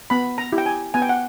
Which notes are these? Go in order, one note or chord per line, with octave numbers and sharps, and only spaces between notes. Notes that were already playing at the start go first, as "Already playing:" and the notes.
B3 B5
A#5
E4 G4
G5
G#5
B3 G#5
G5
F#5